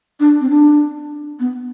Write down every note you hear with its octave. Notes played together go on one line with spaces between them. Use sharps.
D4
C4
D4
B3